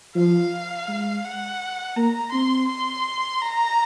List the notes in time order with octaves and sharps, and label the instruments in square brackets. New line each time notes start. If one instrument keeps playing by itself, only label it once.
[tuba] F3 [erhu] F5
[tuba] G#3
[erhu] F#5
[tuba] A#3 [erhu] A#5
[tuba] C4 [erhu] C6
[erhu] C6
A#5